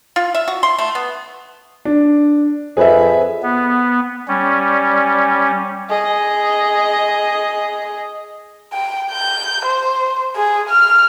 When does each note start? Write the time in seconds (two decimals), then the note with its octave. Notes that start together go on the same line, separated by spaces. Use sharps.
0.16 F4
0.35 E5
0.48 F#4
0.63 C6
0.79 A3
0.95 B3
1.85 D4
2.77 F2 G#4 B4 E5
3.43 B3
4.28 G3 C#4
5.89 G#4 D#5
8.73 G5
9.11 G6
9.65 C5
10.36 G#4
10.69 F6